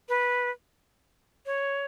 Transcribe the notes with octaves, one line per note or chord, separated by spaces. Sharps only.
B4
C#5